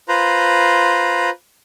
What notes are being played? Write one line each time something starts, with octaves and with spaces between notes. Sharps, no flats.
F4 B4 C5 A#5